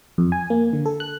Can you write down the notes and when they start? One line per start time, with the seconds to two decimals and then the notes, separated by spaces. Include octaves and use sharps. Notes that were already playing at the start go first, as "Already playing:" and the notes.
0.18 F2
0.32 G#5
0.50 A#3
0.73 D3
0.86 A4
1.00 F#6